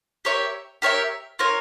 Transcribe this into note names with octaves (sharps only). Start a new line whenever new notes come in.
G4 A#4 C#5 E5
G4 A#4 C#5 E5
F4 A#4 C#5